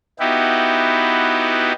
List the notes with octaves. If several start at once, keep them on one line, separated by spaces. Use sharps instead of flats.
B3 D#4 E4 F#4 G4